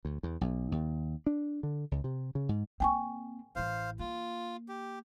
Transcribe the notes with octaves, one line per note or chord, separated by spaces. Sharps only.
D2
E2
B1
D#2
D4
D3
C#2
C3
C#3
G#2
A#3 C4 G5 G#5 C#6
A1 E3 C5 F5
A#3 F4
G4